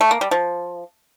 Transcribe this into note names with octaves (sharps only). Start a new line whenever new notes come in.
A3
A#3
G3
F3